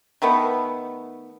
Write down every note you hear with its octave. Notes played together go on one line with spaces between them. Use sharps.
D#3 A3 B3